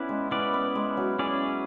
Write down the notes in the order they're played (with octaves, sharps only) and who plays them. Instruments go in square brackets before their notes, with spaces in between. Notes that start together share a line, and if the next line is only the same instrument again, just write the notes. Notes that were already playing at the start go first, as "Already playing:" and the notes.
Already playing: [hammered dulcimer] B3 [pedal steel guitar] C#4 E4 B4 D5
[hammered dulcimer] G#3
[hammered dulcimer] B3 [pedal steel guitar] C#4 E4 B4 D5
[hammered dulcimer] B3
G#3
F#3
[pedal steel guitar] C#4 E4 G#4 D5